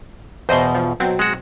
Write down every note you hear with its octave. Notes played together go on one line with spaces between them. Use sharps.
E2 B2 C5 D#5 C6
F3
B2 F#3 C4
G#3 F#4